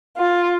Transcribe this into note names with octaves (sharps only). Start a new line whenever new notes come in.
F4